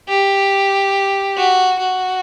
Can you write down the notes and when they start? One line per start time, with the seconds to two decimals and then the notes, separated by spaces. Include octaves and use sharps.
0.08 G4
1.37 F#4
1.79 F#4